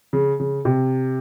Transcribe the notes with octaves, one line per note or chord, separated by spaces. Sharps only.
C#3
C#3
C3